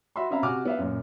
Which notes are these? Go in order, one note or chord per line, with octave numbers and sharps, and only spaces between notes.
F#4 E5 B5 C6
C4 C#4 E5 F5 A#5 B5
C3 F#4 F#5 G#5 D6 F6
B3 E5 F5
F#2 A#2